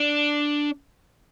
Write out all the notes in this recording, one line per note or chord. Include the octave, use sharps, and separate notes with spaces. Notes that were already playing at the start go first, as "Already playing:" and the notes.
Already playing: D4